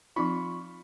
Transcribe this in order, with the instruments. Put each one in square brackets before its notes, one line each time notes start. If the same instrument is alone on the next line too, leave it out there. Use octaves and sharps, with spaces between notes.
[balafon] F3 C4 D#4 [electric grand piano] F4 B5 C#6